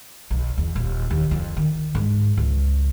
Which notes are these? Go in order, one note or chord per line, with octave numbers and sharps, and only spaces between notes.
B1
E2
D#1
D#2
F2
D#3
G#2
C#2